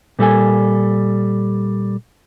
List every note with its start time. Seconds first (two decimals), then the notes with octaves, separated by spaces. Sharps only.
0.19 A#2 G3 A4 G#5